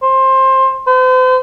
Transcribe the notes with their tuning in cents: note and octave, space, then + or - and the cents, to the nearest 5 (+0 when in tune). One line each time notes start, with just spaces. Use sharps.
C5 +20
C5 -40